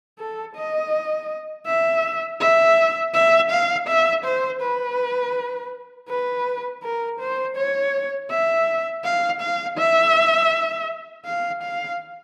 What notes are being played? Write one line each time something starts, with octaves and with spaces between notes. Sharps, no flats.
A4
D#5
E5
E5
E5
F5
E5
C5
B4
B4
A#4
C5
C#5
E5
F5
F5
E5
F5
F5